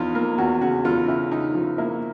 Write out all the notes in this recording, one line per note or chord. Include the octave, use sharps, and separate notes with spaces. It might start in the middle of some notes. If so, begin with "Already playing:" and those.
Already playing: E2 F3 D#4 F4
A#3
E2 F#4
C#3 F#4
E2 F4
C#3 E4
C#3 D#4
F3
A#3 E4